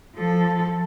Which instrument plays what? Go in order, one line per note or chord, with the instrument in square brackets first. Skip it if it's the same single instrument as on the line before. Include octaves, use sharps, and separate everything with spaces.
[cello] F3 A4